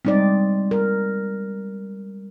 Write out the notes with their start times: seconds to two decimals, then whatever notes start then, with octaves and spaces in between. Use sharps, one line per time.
0.05 G3 G#3 C4 D#4 D5
0.71 A#4